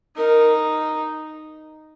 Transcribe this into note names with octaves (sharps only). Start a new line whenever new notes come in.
D#4 A#4